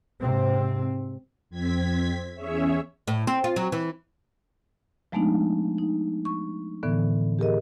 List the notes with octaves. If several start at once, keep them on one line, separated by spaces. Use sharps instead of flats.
G#2 C3 C4
F2 C4 G#6 B6
E2 C#4 G#4 C#5 E5
A2
C4
F4
F#3
E3
F3 G#3 A3 B3 D4 D#4
D#4
C#6
A2 D3 E3 B3
G4 G#4 A#4 D#5